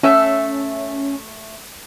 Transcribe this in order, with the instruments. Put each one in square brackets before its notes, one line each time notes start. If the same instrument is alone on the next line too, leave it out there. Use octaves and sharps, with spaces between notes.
[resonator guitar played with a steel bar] A3 E5 [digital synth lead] C#4